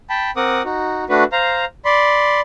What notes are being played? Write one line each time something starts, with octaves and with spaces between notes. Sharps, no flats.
G5 A5 B5
C4 A#4 F#5 D6 D#6
D#4 F#4
A3 D4 F#4 B4
C5 F5 A#5
D5 B5 C6